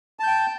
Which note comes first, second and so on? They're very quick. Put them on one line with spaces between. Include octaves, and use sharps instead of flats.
A5 G6 G5